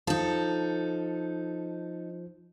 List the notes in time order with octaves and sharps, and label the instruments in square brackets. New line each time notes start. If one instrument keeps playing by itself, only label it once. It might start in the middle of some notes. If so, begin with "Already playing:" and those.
[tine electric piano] F3 [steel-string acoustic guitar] D#4 A4